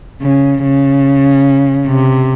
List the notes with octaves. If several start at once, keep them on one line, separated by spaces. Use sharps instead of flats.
C#3
C#3
C3